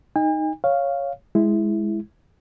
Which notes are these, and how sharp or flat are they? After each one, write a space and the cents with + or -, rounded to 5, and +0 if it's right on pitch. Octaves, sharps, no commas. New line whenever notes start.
D#4 +0 G#5 -45
C#5 +0 F5 +0
G#3 +0 E4 +0